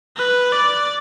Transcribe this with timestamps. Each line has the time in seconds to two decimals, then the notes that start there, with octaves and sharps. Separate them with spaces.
0.17 B4
0.52 D5